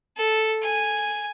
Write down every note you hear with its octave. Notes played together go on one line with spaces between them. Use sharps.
A4
G#5